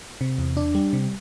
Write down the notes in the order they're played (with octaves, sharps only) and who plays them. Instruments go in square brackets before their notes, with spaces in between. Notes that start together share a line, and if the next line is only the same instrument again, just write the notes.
[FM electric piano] C3
E2
D4
G3
C3